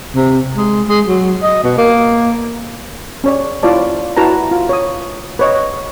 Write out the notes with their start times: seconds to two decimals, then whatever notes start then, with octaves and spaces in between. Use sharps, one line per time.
0.16 C3
0.56 G#3
0.88 G#3
1.08 F#3
1.43 D#5
1.64 B2
1.78 A#3
3.24 C#4 C#5 D5
3.63 E4 F4 C#5 D5 A5
4.17 E4 F#4 B4 A5 A#5
4.51 F4
4.69 C#5 D#6
5.39 B4 C#5 D#5